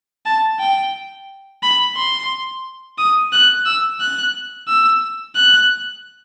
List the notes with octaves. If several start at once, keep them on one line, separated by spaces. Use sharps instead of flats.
A5
G5
B5
C6
D#6
F#6
E6
F#6
E6
F#6